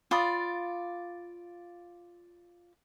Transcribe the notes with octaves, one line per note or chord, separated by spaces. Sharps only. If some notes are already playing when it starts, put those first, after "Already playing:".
F4 D5 B5 D#6